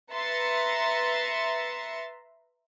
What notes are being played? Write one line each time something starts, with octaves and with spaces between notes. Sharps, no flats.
B4 E5 A#5 C6 A6 C#7